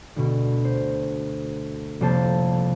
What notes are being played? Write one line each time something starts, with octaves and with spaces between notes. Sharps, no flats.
D2 B2
C5
F1 C2 A#3 C5 A5